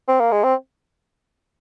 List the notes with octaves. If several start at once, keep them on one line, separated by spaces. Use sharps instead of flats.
C4
A#3
G#3
C4